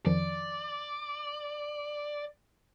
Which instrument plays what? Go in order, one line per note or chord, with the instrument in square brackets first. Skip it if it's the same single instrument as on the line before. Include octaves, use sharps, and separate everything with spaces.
[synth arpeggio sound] F2 D#3 F3 [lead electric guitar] D5